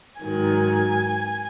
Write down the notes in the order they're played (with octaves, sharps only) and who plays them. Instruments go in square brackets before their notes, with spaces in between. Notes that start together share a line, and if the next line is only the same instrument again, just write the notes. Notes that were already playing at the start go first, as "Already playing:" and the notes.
[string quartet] G#2 D#3 F#3 G#5